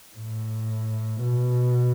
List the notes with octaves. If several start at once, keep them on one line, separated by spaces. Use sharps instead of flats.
A2
B2